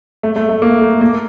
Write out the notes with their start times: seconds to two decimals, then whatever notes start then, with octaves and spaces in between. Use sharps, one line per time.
0.23 A3
0.36 A3
0.49 A3
0.62 A#3
0.81 A3
1.01 A#3